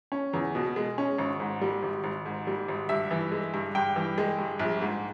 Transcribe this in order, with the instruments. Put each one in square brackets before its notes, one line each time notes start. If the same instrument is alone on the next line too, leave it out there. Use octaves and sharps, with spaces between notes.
[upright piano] C#4
E2
B2
G#3
C#4
G#1
G#2
G3
G#1
G#1
G#2
G3
G#1
G2 E5
E3
G#3
G2
G2 G5
E3
G#3
G2
A#1
G#2